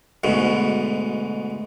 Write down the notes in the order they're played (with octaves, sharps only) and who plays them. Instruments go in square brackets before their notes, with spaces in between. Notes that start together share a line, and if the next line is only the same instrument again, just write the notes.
[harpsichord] D2 G#2 B2